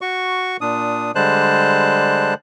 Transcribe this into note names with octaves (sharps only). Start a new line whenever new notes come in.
F#4 C#6
A#2 D4 D#6
D3 G3 G#3 C5 A5 F#6